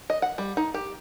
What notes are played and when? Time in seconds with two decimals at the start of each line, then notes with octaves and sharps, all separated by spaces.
0.10 D#5
0.22 F#5
0.38 G3
0.57 D#4
0.74 G4